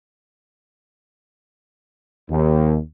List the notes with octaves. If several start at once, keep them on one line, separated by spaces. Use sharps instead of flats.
D#2